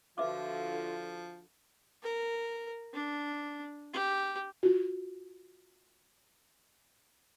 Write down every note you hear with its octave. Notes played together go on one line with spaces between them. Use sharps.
D3 F3 F4 F#4 B4 E5 D6
A#4
D4
G4
F4 F#4